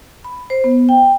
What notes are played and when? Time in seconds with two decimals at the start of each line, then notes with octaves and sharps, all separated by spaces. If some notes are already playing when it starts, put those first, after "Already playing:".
0.24 B5
0.50 C5
0.64 B3
0.89 G5